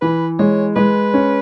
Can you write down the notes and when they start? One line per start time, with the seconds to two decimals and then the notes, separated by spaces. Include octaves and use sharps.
0.01 E3 B4
0.39 G#3 C#5
0.76 G#3 B4
1.14 C#4